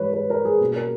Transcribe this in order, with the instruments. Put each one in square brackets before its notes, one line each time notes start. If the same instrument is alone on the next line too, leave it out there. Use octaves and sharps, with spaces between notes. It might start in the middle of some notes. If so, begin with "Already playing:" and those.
Already playing: [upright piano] G#2 E3 G3 B4 C#5
B4
A#4
G#4
B2 G3 A#3 C#4
A#4